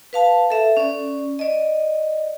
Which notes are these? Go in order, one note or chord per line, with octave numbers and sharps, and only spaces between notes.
B4 F5 A5
A4 E5
C#4 D5
D5 D#5